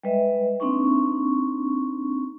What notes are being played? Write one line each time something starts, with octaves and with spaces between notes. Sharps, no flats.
G3 G#3 B4 D#5 E5
A#3 C4 D4 D#4 C#6